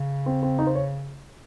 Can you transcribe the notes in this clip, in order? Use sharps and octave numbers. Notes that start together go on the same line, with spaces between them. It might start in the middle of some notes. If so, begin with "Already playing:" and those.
Already playing: C#3
C4
C4
D#4
C5
C#5